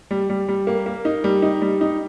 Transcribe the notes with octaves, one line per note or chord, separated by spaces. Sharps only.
G3
G3
G3
A#3
A#3
D#4
G3
D#4
G3
D#4